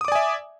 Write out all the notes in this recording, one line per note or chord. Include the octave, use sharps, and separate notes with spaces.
D5 E5 G#5 D6 D#6